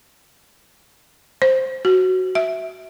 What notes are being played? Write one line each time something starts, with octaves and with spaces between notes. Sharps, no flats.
C5
F#4
E5